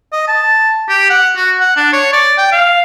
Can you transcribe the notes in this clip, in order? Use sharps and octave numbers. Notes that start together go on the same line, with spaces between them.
D#5
A5
G4
F#5
F#4
F#5
D4
C#5
D5
G5
F5